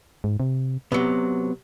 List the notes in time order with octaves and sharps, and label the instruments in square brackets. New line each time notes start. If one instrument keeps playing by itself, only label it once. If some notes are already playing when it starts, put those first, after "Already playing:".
[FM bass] G#2
C3
[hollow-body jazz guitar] C3 F#3 [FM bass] B3